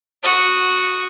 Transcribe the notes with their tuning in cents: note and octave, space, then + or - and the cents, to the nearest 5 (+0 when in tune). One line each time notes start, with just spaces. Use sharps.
F#4 -5 D#6 +0